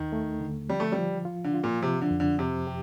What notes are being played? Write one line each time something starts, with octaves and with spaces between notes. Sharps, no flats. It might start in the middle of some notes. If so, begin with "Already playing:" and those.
Already playing: D#2 D#3
A3
D3
F3 G3
A3
G3
F3
F4
D3
F4
A#2
C3 F3
D3
F2
D3
C3 C4
G4